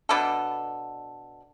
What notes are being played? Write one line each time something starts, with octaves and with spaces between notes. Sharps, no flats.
B2 B3 D4 A4